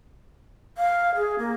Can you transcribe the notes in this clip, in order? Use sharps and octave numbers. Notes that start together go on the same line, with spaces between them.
F5
G#4
A#3